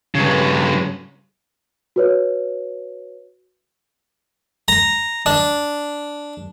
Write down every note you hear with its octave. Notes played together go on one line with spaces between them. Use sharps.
G2 C#3
F#4 B4 C#5
A#5
D4